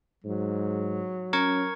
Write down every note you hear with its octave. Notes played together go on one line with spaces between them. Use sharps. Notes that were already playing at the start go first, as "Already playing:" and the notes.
G#2 F#3
C#4 A#4 C#6 G#6